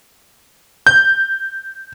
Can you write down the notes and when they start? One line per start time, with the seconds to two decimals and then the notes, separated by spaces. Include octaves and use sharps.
0.87 G6